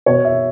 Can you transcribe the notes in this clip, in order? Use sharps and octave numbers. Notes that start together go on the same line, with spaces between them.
B2 C#5
E5